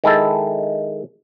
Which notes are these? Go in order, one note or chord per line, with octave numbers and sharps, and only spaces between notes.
D#3 G#3 E4 A4